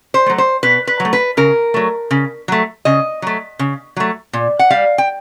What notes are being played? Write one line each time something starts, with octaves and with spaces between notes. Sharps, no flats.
C5
F#3 A3
C5
B2 B4
B4
F#3
A3
B4
C#3 A#4
F#3 A3
C#3
F#3 A3
C#3 D#5
F#3 A3
C#3
F#3 A3
A#2
F#5
G3 F5
G5